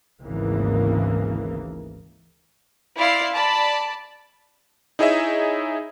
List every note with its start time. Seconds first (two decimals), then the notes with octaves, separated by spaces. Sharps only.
0.22 G#1 D2 C#3 E3 A#3
2.96 E4 D5 F5 C6 C7
3.33 D5 A5 B5
4.99 D#4 E4 G#4 C#5 D#5 E5